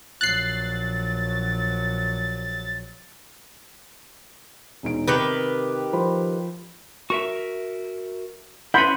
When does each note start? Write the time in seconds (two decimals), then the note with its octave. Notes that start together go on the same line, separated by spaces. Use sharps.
0.21 A#1 F#3 F#6 A6 C7
4.83 E1 D#4 D7
5.07 C3 D#3 G4 B4
5.93 F3 C5 B5
7.10 F#4 A#4 E5 C#6
8.74 C#4 E4 F#5 B5 C6 G6